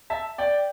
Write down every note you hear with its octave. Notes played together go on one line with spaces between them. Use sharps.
E5 A5
D5 G5